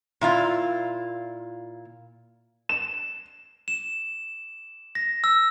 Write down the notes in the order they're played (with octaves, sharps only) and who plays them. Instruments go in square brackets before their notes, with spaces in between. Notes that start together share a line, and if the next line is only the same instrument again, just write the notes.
[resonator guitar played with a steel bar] A#2 E4 F4
[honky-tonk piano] E7
[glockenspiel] E7
A#6
E6